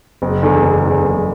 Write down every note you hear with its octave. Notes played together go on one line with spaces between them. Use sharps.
F#1
E2 D3
F#1
E2 D3
F#1